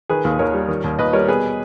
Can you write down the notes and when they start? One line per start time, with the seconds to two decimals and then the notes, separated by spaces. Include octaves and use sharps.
0.09 D#3 G#4 B4
0.25 D#2
0.39 D#2 A#4 C#5
0.53 G3
0.68 D#3
0.84 D#2
0.99 D#2 B4 D#5
1.13 G3 A#4 C#5
1.28 B2 G#4 B4